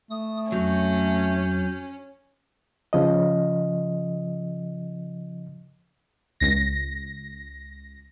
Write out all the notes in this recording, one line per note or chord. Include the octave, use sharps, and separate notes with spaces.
A3 D#6
F2 F#3 C#4 G6
C#3 F3 D#5
C#2 A#6